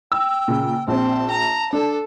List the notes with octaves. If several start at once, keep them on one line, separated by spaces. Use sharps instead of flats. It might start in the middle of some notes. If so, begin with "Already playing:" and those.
G5 E6
A#2 C#3
A#1 C4 A5
A#5
D4 A4